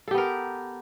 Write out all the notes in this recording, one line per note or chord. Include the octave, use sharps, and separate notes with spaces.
B3 G4 A4 A#4